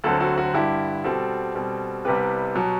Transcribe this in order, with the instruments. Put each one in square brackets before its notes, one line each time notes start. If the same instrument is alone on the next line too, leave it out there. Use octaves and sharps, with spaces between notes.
[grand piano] D2 D3 F#3 C4 F#4 A4
F#4 A4
F#4
G2 D3 G3 E4 G4
B2 G3 C4 F#4 A4
B2 G3 C4
C2 C3 G3 B3 G4 B4
B2 F#3